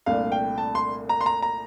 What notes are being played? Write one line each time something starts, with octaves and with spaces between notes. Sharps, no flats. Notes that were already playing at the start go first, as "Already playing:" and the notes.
C2 A#2 A3 D4 F5
G5
A5
C6
A#5
C6
A#5
A#5